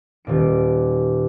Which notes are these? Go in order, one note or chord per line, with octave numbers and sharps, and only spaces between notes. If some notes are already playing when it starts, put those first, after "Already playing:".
D#1 A#2 D7